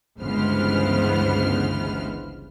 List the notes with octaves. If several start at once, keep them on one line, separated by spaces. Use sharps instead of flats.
G1 C#2 E3 B3 C5 F6